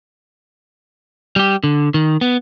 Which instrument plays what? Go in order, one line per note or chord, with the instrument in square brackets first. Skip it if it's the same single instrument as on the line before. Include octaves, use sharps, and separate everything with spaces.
[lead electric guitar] G3 G4
D3
D#3
B3